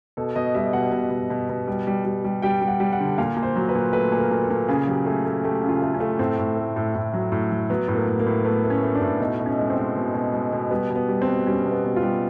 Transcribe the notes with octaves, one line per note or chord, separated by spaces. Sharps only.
B2 A4
B2 D#5
G3 E5
B2 F#5
B2
B2
B2
B2
G3
G3
G3
G3
G3 G5
G3
F#5
G3
F#5
D3
A#2 F5
A#2
C5
F#3
B4
A#2
A3 B4
A#2
A#4
A#2
A4
A#2
C#3 G#4
F#3 G4
A3 G#4
A3
A3 G4
C#3
F4
A3
C#4
A3
A2 C4
A2
A3
A2
A2
F#3
A2
F#3
F#3 B3
A2
A#3
A2
A#3
A2
A3 B3
A3
C#4
A3
D4
A2
B2 D#4
B2
C#4
G#3
C4
G#3
B2
B2
G#3
B2
G3 B3
B2
B3
G3
C4
B2
G3 C#4
B2
B3
B2
F4
G3